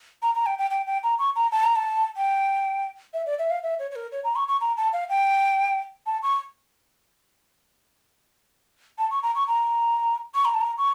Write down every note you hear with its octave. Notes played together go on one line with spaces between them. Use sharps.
A#5
A#5
G5
G5
G5
G5
A#5
C#6
A#5
A5
A#5
A5
G5
E5
D5
E5
F5
E5
C#5
C#5
A#4
C#5
A#5
C#6
C#6
A#5
A5
F5
G5
A5
C#6
A5
C#6
A#5
C#6
A#5
C#6
A#5
A5
A#5
C#6